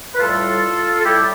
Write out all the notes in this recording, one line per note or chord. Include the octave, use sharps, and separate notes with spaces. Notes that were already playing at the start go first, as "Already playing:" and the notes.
B4
A2 G3 F4 A4
A4
A2 G3 E4 G4